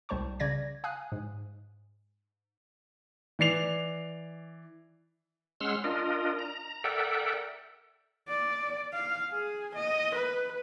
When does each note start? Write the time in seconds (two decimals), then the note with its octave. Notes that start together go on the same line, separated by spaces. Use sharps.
0.09 C2 G3 C5 A5 C#6
0.40 C#3 D5 G#6 A#6
0.84 F5 G#5 D#6 F#6
1.12 G#2
3.39 E3 D5 C7 F7
5.61 G#3 C#4 F#5 C6 E6 F6
5.84 D4 F4 A#4 D#5
6.39 A#5
6.84 A4 A#4 D5 E5 F#5 G5
8.29 D5
8.93 F5
9.32 G#4
9.75 D#5
10.15 B4